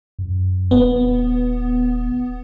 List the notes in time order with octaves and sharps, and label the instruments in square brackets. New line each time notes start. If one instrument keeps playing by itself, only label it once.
[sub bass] F#2
[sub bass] D#1 [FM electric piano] B3